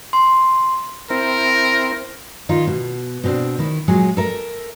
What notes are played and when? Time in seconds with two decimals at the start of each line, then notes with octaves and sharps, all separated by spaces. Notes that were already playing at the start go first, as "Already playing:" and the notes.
0.13 C6
1.10 C4 E4 A#4 C5
2.49 D#3 D#4 F4
2.67 B2
3.24 B2 C4 D4
3.59 D#3 E4
3.88 A#2 F#3 G#3 G#4
4.17 A4 A#4 E5